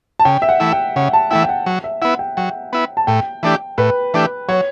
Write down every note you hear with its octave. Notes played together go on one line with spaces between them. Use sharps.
A5
C#3 G5
E5
F#5
E3 A3 E4
G5
C#3 F#5
A5
E3 A3 E4 G5
G5
F#5
F#3
E5
B3 E4 F#5
G5
F#3 G5
B3 E4
A5
A2 G5
E3 A3 D4 G4
A2 B4
E3 A3 D4 G4
F#3 C#5